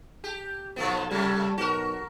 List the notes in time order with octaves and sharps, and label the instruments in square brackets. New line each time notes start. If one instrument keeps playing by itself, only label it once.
[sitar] G4
[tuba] B1 [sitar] F3 A3 B3
[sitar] A2 C3 A3 [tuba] G3
[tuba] B1 [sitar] F#4 A#4